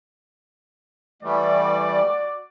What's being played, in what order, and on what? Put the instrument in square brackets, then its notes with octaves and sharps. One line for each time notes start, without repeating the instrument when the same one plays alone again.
[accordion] E3 G3 A3 [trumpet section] F#4 D5